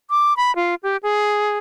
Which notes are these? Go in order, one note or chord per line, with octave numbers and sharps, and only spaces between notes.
D6
B5
F4
G4
G#4